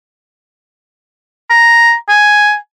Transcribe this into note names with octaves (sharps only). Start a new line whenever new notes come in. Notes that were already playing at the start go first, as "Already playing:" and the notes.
A#5
G#5